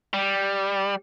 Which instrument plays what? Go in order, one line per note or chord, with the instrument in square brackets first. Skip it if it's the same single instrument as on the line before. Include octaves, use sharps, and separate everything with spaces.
[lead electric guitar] G3